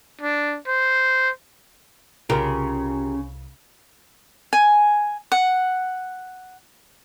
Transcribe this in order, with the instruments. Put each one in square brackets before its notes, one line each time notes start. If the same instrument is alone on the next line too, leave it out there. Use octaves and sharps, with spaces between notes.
[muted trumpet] D4
C5
[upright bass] C2 [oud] C#3 [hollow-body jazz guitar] F4 G4 A#4
[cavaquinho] G#5
F#5